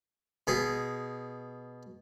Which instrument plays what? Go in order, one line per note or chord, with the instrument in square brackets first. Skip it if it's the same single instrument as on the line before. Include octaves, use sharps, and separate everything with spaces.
[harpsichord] B2 G#4